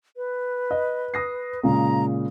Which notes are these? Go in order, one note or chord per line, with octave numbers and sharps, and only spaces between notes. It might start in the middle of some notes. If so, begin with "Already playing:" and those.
B4
D#5
D#6 A#6 C7
A#2 C#3 G#3 A#5